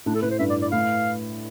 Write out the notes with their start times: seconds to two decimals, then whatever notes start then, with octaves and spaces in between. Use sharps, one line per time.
0.06 A2 D4
0.15 A4
0.22 A2 B4
0.31 C5
0.39 G2 E5
0.50 D5
0.62 D5
0.72 A2 F5